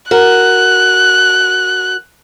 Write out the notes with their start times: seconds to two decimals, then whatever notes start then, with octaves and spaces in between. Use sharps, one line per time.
0.11 F#4 A#4 F#6